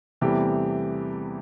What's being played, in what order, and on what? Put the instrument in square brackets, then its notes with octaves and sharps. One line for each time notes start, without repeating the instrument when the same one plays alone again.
[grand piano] E2 C3 E3 G3 A3 G4